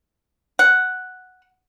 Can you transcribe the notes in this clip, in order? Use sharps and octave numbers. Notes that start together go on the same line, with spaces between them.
F#5